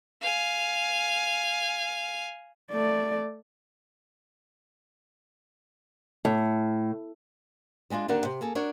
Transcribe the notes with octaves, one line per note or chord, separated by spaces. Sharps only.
F5 G#5
A3 D5
A2
G3 G#3 D4 F4 G#4
D#2 D3 D4 A#4 F#5
C3
A#3 G#4 A4
D4 F#4 A#4 C#5